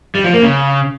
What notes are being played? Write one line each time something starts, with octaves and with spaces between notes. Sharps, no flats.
G3
F3
A#3
C#3